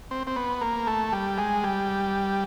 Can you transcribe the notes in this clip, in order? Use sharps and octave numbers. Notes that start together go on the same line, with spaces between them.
C4
C4
B3
A#3
A3
G3
G#3
G3